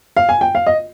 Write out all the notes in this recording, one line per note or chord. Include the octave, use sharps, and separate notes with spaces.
F5
G#5
G5
F5
D#5